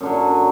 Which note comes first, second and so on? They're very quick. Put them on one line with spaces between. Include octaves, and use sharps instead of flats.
F#2 D3 F#3